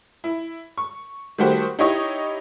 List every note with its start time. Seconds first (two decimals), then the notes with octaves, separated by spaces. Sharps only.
0.24 E4
0.78 C#6
1.38 D#3 G3 A3 F#4 G4 C5
1.79 D#4 E4 G4 C#5 D#5 C#6